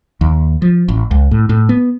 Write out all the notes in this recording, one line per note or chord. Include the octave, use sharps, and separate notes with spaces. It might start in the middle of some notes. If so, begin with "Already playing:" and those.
D#2
F3
A1
C#2
A2
A2
B3